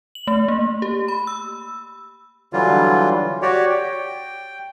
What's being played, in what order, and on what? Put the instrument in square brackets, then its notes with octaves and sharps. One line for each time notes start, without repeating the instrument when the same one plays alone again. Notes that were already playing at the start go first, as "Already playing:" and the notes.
[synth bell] F#7
A3
A#3
G4
B5
E6
[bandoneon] D3 E3 F#3 G3 F4
F#4 G4 C#5 D5
G5